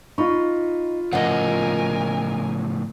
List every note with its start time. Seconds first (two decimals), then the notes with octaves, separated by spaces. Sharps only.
0.18 D#4 F4 B5 C#6
1.13 A2 C#3 F3 A#4 D#5 F#5 G#5